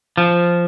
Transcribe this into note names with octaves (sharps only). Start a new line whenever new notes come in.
F3